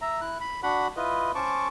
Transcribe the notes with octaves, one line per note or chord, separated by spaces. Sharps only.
E5 A#5
E4 F#6
B5
D4 F#4 F#5 B5
E4 F4 B4 D#5
C#4 C5 A5 C#6 D6